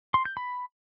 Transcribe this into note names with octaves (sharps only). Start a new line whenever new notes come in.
C6
G6
B5